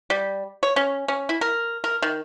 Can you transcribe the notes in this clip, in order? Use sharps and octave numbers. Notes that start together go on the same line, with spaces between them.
G3
C#5
C#4
C#4
E4
A#4
A#4
D#3